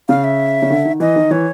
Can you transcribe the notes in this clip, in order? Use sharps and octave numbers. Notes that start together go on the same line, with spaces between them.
C#3 F5
E5
C#3
D3
D#3
E3 D#5
D#3
E3 C#5